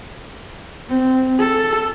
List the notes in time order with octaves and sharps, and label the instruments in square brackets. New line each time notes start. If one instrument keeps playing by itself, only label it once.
[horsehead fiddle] C4
A4